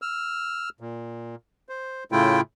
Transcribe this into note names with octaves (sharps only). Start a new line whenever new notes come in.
E6 F6
A#2
C5
A2 C#3 A3 E4 F4 G5